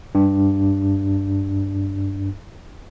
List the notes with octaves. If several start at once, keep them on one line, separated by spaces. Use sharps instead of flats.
G2 D4